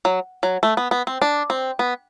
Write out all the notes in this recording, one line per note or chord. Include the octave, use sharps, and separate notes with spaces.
F#3
F#3
A3
B3
B3
C4
D4
C4
B3